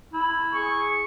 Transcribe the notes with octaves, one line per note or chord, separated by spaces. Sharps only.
E4
G#4 C#6